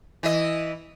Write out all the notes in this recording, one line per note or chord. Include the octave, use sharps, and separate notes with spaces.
E3 E4 D#5